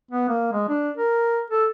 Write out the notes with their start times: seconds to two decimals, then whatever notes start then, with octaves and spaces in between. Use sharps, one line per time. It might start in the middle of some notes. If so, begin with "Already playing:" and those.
0.11 B3
0.28 A#3
0.53 G#3
0.68 D4
0.97 A#4
1.50 A4